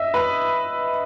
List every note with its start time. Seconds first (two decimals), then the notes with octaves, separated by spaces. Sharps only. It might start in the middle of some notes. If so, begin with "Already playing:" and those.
Already playing: D#5 E5
0.14 B4